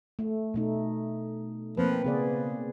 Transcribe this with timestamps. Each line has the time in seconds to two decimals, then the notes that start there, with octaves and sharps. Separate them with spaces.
0.19 A3
0.54 B2 A3 D#4
1.77 F3 A#3 C4 B4
2.05 C#3 B3 G#4 D5